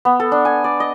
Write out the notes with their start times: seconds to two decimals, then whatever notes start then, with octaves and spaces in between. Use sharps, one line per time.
0.05 B3
0.20 A4
0.32 D4
0.45 G#5
0.64 D5
0.80 D#5